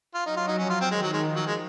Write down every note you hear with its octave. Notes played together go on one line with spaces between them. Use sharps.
F4
F#3 D#4
F4
D#4
F3 C#4
F4
C4
D#3 G#3
F#3
G#3
F3
F#3
G#3